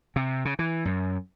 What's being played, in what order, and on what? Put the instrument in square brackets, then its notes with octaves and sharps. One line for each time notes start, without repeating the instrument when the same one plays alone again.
[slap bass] C3
C#3
E3
F#2